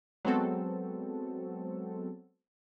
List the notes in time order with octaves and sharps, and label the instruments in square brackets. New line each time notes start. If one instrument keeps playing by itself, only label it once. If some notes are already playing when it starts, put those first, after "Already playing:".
[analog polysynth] F#3 G#3 B3 C4 F#4 A4